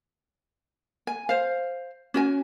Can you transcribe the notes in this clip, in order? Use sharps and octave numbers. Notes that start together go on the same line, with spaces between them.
G#5
C5 F5
C#4 F#4 G#5